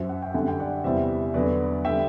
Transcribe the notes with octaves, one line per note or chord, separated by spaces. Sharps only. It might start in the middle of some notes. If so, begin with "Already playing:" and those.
Already playing: F#2 F#3 C5 E5
F#5
G5
F#2 D3 G3 F#5
G5
D5 F#5
E2 C3 E3 G3 C5 E5
E2 D3 F#3 B4 D5
D3 G3 E5 G5